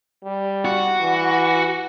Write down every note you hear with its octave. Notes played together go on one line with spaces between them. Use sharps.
G3
F#4
E3